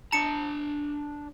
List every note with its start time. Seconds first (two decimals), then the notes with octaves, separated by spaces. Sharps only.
0.12 D4 A5 A#5 C#7